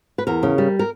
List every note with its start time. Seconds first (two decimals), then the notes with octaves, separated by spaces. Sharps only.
0.18 B4
0.27 E2 A#4
0.43 C#3
0.58 G3
0.79 A#4